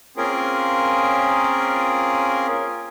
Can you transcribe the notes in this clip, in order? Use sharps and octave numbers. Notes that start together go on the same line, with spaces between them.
A#3 C4 C#4 F4 G#4 A#4